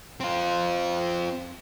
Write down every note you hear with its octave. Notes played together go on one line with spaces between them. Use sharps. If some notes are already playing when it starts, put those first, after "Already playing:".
C4 F4